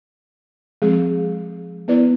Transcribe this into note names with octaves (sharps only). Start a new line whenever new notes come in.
F3 G#3 C4 G#4
B3 E4 B4 D5